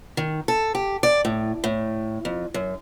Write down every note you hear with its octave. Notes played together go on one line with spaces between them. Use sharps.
D#3
A4
G4
D5
A2
A2
F2
F#2